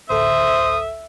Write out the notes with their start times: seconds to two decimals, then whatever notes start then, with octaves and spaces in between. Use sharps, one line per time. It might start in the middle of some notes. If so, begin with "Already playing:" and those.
0.10 A1 D2 A4 C5 E5 D#6